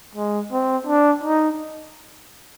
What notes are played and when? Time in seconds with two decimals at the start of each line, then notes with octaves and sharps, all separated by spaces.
0.15 G#3
0.52 C4
0.87 D4
1.24 D#4